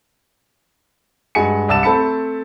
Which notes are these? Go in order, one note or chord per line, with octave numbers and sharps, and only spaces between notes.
G2 G#3 F#4 G#5 C#7
C2 D5 A5 E6 A6 E7
A3 C4 A5 B5 C#7